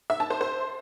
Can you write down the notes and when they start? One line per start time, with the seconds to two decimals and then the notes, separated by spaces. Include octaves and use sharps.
0.10 E5
0.20 A5
0.30 C5
0.41 C5